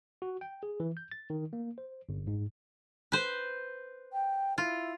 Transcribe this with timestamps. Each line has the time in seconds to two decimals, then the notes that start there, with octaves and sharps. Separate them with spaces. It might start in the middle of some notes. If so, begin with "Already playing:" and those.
0.22 F#4
0.41 G5
0.63 G#4
0.80 E3
0.97 G6
1.11 A6
1.30 D#3
1.53 A#3
1.78 C5
2.09 G1
2.27 G#2
3.12 B4 C5
4.12 G5
4.58 E4 F4